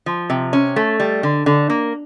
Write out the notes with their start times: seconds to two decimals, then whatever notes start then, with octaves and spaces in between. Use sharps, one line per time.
0.06 F3
0.30 C3
0.53 C#4
0.76 A3
1.00 G3
1.23 D3
1.46 D3
1.70 A#3